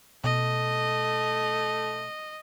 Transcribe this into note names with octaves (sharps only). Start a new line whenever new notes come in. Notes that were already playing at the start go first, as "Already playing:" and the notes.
B2 A3 D#5